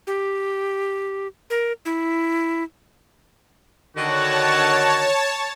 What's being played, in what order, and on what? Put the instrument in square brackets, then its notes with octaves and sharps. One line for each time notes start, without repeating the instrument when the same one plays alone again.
[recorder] G4
A#4
E4
[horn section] D3 D#3 F#4 [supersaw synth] C#5 A5